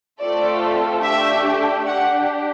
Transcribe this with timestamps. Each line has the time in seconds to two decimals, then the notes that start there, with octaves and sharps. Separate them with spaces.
0.22 A3 C4 F4 A4 D5
1.03 A3 D4 G4 E5
1.86 D4 G4 F#5